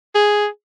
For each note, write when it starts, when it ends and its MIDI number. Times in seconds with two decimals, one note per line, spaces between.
0.15 0.47 68